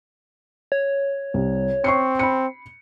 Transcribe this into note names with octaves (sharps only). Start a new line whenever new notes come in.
C#5
C2
C4 C#6 C7 C#7
B5 C#7